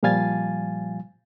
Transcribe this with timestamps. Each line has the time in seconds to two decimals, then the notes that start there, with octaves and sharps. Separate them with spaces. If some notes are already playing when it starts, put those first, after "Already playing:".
0.03 A#2 F3 G3 F5 G#5 A6